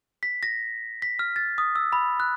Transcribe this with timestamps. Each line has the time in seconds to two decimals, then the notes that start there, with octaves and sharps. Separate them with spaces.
0.23 B6
0.43 A#6
1.02 B6
1.19 F6
1.36 A6
1.58 D#6
1.76 E6
1.93 B5
2.20 F#6